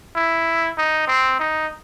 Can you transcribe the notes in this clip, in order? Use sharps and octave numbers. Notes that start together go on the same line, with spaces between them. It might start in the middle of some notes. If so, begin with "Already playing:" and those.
E4
D#4
C4
D#4